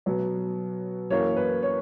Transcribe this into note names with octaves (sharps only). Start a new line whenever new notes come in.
B2 F#3 B3
F#2 E3 A#3 C#5
B4
C#5